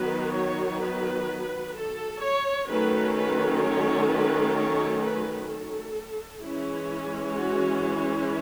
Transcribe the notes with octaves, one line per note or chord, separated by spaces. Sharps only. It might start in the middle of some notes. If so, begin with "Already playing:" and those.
Already playing: D#3 F#3 B3 B4
C#5
B4
A4
C#5
D#3 F#3 A3 C#4 B4
B4
C#5
B4
C#5
B4
A4
E3 G#3 C#4 E4
F#4